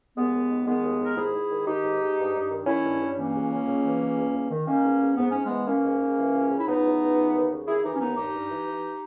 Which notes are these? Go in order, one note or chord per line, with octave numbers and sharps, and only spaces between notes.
D#2 G#3 B3
D#2
D#3
D#3 G#3 B3
D#2
D#2 A#4
G#2 E4 G#4
G#2
D#3
D#3 D#4 G4
G#2
G#2
G2
G2
D#3
D#3 C#4 E4
G2
G2
E3 A#3 C#4
C#2
C#3
C#2
E3
C#2
E2
E2
D#3
D#3 A#3 C#4
E2
E2
G#2 B3
G#2 C#4
G#3 B3
E3
E3 A#3 C#4
G#2
G#2
E3
C#2
C#3
E4
C#2 B3 D#4
E3
C#2
E3
D#2
C#3
D#2 E4 G#4
E3 D#4 G4
C#4
D#2 B3 D#4
G2 D#4 G4
G2
E3
E3